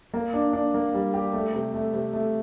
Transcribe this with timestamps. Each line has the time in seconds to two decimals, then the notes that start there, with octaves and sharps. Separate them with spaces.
0.14 A#3
0.34 D4
0.53 D4
0.74 A#3
0.94 G3
1.14 G4
1.33 A3
1.53 C3
1.74 A3
1.93 C3
2.13 A3